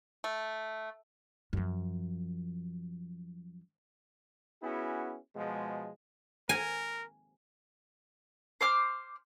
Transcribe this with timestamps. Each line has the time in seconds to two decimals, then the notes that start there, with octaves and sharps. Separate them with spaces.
0.24 A3
1.53 F#2 F3
4.63 B3 C#4 E4 F#4 G#4
5.36 B2 F3 G#3
6.49 A#4 G#5
8.61 C5 D6 F6